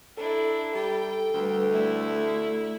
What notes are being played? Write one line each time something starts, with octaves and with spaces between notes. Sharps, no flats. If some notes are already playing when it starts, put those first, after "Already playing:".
D4 E4 A4 A#5 B5
G3 G5
D2 G3 B4
A3 E4 D5